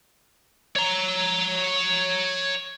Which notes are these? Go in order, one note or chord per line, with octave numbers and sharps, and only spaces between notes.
C#5 A#5